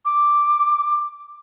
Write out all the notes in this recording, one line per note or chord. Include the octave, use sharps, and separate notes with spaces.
D6